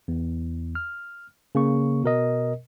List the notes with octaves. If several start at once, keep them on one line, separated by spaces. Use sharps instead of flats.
E2
F6
C#3 A#3 C#6
B2 A#4 D#5